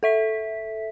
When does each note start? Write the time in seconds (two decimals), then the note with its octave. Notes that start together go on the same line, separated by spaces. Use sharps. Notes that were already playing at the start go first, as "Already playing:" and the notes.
0.03 A4 E5 B6